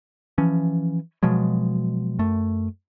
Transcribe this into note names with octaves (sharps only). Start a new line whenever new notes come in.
E3 F3 C#4
B2 F3 F#3 G#3
F#2 A3